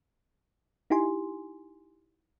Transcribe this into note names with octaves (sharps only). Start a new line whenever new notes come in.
D#4 E4 G4 G#5 C6